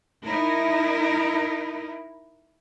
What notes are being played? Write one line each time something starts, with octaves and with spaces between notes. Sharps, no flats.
D#4 E4 A#4